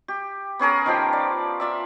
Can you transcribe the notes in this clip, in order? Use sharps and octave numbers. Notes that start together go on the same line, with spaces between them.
G4
B3 C#4 G#4 A#4
D#3 F3 G4
D5
F4 D5 E5